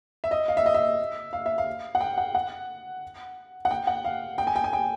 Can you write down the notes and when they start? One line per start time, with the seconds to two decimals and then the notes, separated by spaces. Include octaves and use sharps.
0.24 E5
0.31 D#5
0.48 F5
0.57 E5
0.66 D#5
0.74 E5
1.33 F5
1.46 E5
1.58 F5
1.95 F#5
2.01 G5
2.18 F#5
2.35 F#5
3.65 F#5
3.71 G5
3.87 F#5
4.05 F5
4.38 G5
4.47 G#5
4.56 G5
4.64 G#5
4.73 G5